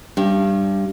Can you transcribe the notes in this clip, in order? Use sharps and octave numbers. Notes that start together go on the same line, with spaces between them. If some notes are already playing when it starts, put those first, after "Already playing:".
G2